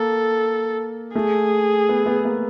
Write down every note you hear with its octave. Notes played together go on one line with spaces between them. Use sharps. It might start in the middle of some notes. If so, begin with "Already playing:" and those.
Already playing: A#3 A4
A3 G#4
B3
B3
A#3